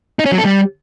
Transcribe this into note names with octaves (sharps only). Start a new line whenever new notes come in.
D#4
C#4
F#3
A4
G3